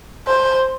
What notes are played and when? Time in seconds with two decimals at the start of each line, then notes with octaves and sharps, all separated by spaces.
0.28 C5